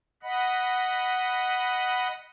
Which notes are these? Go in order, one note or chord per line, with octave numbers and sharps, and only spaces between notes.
D#5 F#5 B5